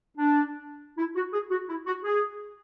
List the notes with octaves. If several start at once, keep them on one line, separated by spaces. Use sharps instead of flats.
D4
E4
F#4
G#4
F#4
E4
F#4
G#4